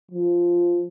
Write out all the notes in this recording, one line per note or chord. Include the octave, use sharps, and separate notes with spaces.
F3